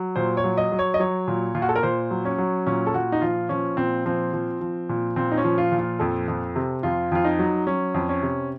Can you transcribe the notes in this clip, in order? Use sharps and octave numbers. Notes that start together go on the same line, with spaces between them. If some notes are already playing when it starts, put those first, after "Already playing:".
Already playing: F#3
A#2 C5
C#5
F#3
D#5
F#3
C#5
D#5
F#3 C#5
A#2
A#2 F4
F#4
A4
A#4
A#2 C5
F#3
C#4
F#3
A#2 C#4
A4
A#2 F#4
D#4
F3 F4
F3 C#4
A#2 C4
F3 C4
F3
F3
A#2
A#2 C4
D#4
C#4
F3
F4
A#2
F4
F2 A4
F2
C3
F2 F4
F2 F4
D#4
F#3
F#3 C#4
F2
C#4
C3